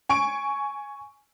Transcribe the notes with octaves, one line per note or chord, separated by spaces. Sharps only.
G#5 C#6 D7